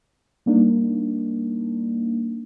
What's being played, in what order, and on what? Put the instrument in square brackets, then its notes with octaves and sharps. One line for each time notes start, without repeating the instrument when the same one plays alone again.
[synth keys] G3 A#3 D4 D#4